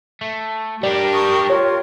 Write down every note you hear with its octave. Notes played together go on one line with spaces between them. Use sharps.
A3
G3 D4 G4 A#4 D5
C#6 D#6
F4 C#5